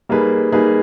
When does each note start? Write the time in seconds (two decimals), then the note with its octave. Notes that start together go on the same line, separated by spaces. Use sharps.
0.09 G3 A#3 D#4 G#4 B4
0.52 G3 A#3 D#4 G#4 B4